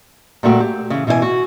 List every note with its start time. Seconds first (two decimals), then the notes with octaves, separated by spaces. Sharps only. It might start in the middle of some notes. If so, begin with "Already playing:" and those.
0.43 A#2 G3 A3 F#4 G5
0.60 G4
0.90 C#3 E3
1.07 B2 E3 E4 C5 G#5
1.22 F#4